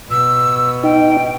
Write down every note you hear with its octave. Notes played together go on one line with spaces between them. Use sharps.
B2 E6
D#4 G5